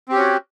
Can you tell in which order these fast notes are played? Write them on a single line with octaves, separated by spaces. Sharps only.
C4 G4 C#4 F#4